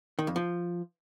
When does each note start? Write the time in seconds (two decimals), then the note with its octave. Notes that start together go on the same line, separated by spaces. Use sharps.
0.19 D#3
0.27 F2
0.36 F3